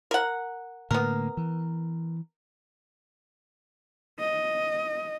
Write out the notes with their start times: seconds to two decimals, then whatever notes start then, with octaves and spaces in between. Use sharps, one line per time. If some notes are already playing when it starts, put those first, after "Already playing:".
0.11 A#4 F#5
0.91 A2 D3 A#3 B3 A#4
1.37 E3
4.19 D#5